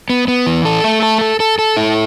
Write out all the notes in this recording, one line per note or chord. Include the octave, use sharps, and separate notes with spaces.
B3
B3
E3
A4
A3
A4
A4
A4
A4
E4